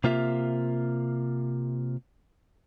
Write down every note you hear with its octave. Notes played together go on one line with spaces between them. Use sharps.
C3 A#3 F4 E5